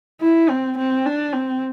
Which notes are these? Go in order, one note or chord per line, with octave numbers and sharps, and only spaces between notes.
E4
C4
C4
D4
C4